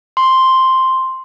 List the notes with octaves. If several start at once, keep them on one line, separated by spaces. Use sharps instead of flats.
C6